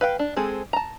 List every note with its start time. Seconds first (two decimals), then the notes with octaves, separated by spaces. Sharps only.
0.01 B4 F5 G5
0.19 D4
0.36 G#3 C4 G#4 A4
0.73 A5 A#5